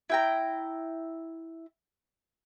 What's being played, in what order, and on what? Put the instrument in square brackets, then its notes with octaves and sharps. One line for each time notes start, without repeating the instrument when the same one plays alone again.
[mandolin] E4 G5 A#5